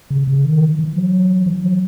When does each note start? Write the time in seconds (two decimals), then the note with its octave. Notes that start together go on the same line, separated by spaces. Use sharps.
0.11 C#3
0.27 C#3
0.45 D#3
0.62 E3
0.79 E3
0.96 F#3
1.46 E3
1.64 F#3